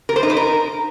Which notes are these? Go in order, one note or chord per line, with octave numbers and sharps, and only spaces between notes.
A#4
C5
D#4
B4
A#4